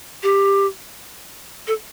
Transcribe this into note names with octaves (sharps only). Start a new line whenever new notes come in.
G4
A4